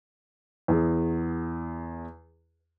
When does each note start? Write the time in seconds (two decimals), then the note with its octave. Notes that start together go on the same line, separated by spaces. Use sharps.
0.68 E2 G#4